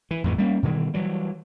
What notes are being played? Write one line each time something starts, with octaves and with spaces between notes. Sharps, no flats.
E3
A1 F2 G#2 E3
G3 A#3 C#4
B2 D#3 E3 G3
E3 F#3 G3